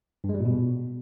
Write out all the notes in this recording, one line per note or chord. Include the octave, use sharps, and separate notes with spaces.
G2
G#3
G3
A#2
B2